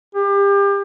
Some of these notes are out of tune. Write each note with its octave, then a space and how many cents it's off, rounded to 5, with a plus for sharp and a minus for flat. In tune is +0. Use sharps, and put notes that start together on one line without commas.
G4 +30